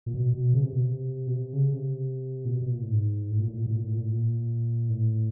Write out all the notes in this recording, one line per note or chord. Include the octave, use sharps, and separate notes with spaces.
A#2
B2
B2
C#3
C3
B2
C3
B2
C3
C#3
C3
A#2
B2
B2
A#2
A2
G#2
A2
A#2
A2
A#2
A2
A#2
A2
A#2
A2
A#2
A2